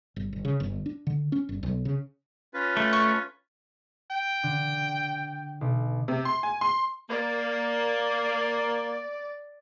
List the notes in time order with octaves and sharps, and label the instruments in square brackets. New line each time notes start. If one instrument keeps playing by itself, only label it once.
[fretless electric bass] G1
G1
C#3
G1
D4
D3
C#4
G1
B1
C#3
[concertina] C#4 F4 B4
[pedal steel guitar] A3
[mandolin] C#6
[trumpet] G5
[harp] D3
B1
[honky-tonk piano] C3
C6
G#5
C6
[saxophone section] A#3 [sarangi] D5